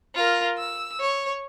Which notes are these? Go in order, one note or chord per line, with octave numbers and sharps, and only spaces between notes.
F4 A#4
E6
C#5